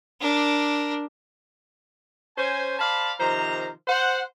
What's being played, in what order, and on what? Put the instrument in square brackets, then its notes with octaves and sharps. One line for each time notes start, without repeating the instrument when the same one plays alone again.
[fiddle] D4 A#4
[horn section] C#4 C5 G#5
C5 D5 F5 A5 B5
C3 D#3 F3 C5 A#5
C5 F#5